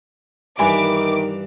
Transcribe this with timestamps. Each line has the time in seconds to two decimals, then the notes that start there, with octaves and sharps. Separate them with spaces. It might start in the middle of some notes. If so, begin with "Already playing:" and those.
0.59 G2 D#3 E3 E4 G#5 B5 D6